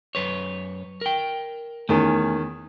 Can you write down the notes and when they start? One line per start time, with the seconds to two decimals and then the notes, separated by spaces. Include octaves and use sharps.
0.15 F#2 B4 C#5
1.01 A#4 G5
1.89 E2 D#3 A3 C#4